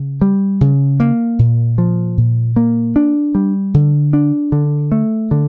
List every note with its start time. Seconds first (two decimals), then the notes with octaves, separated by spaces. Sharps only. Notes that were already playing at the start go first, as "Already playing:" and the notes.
Already playing: C#3
0.21 G3
0.61 C#3
1.00 A#3
1.39 A#2
1.78 F3
2.18 A#2
2.56 A#3
2.96 D4
3.35 G3
3.74 D3
4.13 D4
4.52 D3
4.92 A3
5.31 D3